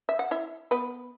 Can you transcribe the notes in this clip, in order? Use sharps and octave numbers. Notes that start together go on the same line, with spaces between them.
E5
F#5
E4 E5
B3 B4